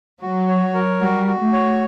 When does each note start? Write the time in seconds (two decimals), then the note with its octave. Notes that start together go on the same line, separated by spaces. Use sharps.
0.21 F#3 F#4
0.48 C#5
0.75 A#4
1.01 G3 F#4
1.27 F#4
1.40 A3
1.53 C#5